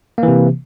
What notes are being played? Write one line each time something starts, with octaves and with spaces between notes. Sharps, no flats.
C3 E3 A#3